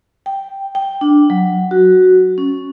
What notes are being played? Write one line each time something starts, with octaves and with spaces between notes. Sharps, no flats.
G5
G5
D4
F#3
F#4
C#4